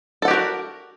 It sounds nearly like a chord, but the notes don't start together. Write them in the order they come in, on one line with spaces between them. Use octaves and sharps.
A4 F#5 G4 F#4 A#4